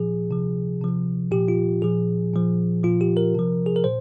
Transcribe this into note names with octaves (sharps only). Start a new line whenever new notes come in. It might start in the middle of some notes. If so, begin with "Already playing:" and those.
Already playing: A#2 F3 G#4
C3 F3
C3 F3
A#2 F3 G4
F4
A#2 F3 G#4
A#2 F3
A#2 F3 F4
G4
A#4
C3 F3
G#4
A#4
A#2 C5